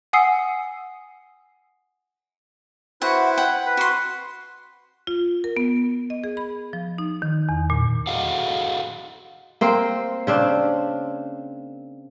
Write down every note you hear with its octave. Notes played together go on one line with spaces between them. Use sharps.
F#5 G#5 D#6 E6 C7
E4 F#4 B4 C5 F#5
F#5 G5
B4
F#4 C6
F4
A#4
B3
D#5
G#4
B5
F3
D#4
D#3
E2
A#2
F#4 G#4 A4 D#5 F5 F#5
A#3 C4 C5
C#3 C4 D4